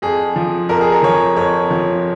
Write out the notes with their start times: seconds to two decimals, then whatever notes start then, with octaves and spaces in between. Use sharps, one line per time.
0.02 F2 G#4
0.36 F3
0.69 F2 A#4
0.81 G#4
0.92 A#4
1.03 F3 C#5
1.37 F2 C#5
1.70 F3